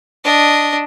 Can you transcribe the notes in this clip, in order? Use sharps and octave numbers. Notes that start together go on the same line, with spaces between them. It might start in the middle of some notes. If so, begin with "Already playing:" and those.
D4 D#5